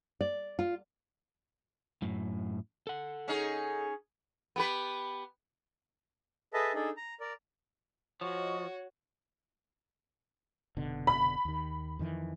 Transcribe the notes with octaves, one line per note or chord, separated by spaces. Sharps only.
D5
F4
F#2 A2
A4 F#5
C#4 D#4 G#4
B3 G4 B4
G#4 A4 B4 D#5 E5 A5
D4 D#4 G#4 A4
A#5
A#4 D5
F3 F#4 C#5 D#5 C#6
F1 B2 D3
B5
D#2 D#3
F2 D#3 E3